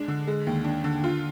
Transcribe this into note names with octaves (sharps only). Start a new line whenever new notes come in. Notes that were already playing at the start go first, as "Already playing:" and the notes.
Already playing: G#3 D4
D3
G#3
D#2
D4
D3
F4